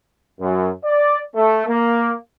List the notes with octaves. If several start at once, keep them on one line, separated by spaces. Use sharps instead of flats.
F#2
D5
A3
A#3